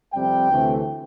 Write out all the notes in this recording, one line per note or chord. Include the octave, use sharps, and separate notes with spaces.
F2 C3 G3 C4 G5
D2 C3 E3 A3 C4